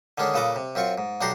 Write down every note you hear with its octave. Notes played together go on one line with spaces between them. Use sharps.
D3 D#3 G#3 C#4 D4
A#2 C#3 A4 B4 D#5 D6
C3
F#2 C4 F4 C#6
G#2
B1 D4 F#4 G4 A#5 C6